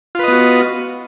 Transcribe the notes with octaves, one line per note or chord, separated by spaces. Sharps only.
B3 F4 F#4 B4 D#5